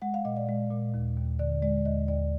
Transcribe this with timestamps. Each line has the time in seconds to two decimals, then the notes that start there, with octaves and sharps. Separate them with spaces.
0.02 G#3 F#5
0.14 F5
0.25 A#2 D#5
0.37 D5
0.48 G#3
0.71 A#2
0.94 D#2
1.17 D#2
1.39 D3 D5
1.62 G#3 D5
1.85 D#2 D#5
2.08 D#2 D5